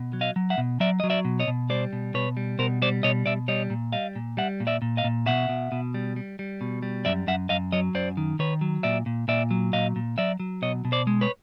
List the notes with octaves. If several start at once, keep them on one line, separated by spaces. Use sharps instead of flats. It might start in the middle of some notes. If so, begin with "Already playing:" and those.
Already playing: B2
F#3
D#5 F5
F#3
E5 F#5
B2
F#3 D5 E5
F#3 D#5
D5 E5
B2
C#5 D#5
B2
G3 C5 D5
B2
B2 B4 C#5
G3
B2 A#4 C5
G3 C5 D5
B2 C#5 D#5
B2 D5 E5
G3 C#5 D#5
A#2
G3 D#5 F5
A#2
G3 E5 F#5
A#2
D5 E5
A#2
D#5 F5
A#2
B2 E5 F#5
B2
B2
G3
G3
G3
B2
G3
F#2 D5 E5
F#2 E5 F#5
F#2 D#5 F5
F#3 C#5 D#5
F#2 C5 D5
D#3
D#3 B4 C#5
F#3
A#2 D5 E5
A#2
A#2 D5 E5
F#3
A#2 D#5 F5
A#2
F#3 D5 E5
F#3
B2 C#5 D#5
B2
C5 D5
G#3
B4 C#5